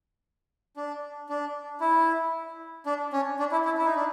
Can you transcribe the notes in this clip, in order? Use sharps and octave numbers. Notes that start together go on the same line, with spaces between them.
D4
D4
E4
D4
C#4
D4
E4
E4
E4
D#4
D4